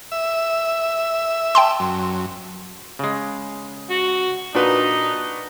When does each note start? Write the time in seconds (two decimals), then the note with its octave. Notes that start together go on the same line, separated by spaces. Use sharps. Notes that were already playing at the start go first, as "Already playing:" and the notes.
0.12 E5
1.55 G5 A5 C6
1.80 F#2
2.99 C#3 G#3
3.90 F#4
4.55 A#2 D4 D#4 F#4 B4